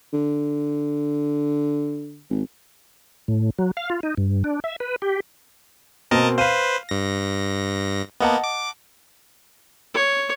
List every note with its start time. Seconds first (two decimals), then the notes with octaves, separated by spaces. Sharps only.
0.13 D3
2.30 G#1
3.28 A2
3.59 F#3
3.77 F5
3.90 F4
4.03 D#4
4.17 G2
4.44 D4
4.64 E5
4.80 B4
5.02 G4
6.11 B2 A#3 C4 A#4 D#5 A5
6.38 B4 C5 F5 D#7
6.89 G2 A#6
8.21 A#3 B3 D#5 F#5 A5
8.44 D6
9.94 C#5